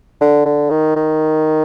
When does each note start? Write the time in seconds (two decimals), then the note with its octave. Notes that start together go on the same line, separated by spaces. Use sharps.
0.21 D3
0.46 D3
0.71 D#3
0.96 D#3